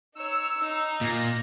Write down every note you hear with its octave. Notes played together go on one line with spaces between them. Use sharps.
D#4 C#5 E6
D#4
A#2 A#6